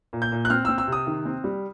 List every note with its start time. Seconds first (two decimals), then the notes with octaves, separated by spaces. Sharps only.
0.13 A#2
0.22 G6
0.32 A#2
0.45 F#6
0.50 C4 F6
0.65 C4 E6
0.78 E6
0.87 C3 D#6
1.07 D#3
1.25 C4
1.44 G3